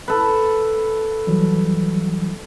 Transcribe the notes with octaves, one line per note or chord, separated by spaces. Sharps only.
A4 B4
E3 F#3 G3